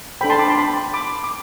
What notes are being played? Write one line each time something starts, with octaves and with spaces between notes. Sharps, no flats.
D4 A4 C5 G5 B5
A5 C6
B5 D6
A5 C6
G5 B5
B5 D6
D6